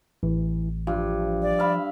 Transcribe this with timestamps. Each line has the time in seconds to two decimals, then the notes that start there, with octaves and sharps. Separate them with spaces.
0.23 A1 E3
0.87 G2 F3
1.42 D5
1.59 E5 F5 B5